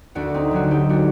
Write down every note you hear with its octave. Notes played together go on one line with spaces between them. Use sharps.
D2 D4 F#4
C4 D#4
D3 F#3 D4 F#4
D#4 G4
D4 F#4